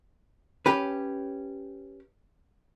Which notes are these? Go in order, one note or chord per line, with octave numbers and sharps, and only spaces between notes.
C#4 G4 B4